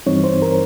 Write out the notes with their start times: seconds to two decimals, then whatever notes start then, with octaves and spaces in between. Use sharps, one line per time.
0.06 G2 E3 G3 C4 D#4 C#5
0.24 C5
0.42 A#4